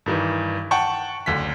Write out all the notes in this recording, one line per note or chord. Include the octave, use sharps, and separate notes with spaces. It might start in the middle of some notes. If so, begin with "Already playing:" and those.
G2 D#3 E3
F#5 G5 A5 C#6
F#1 D2 B6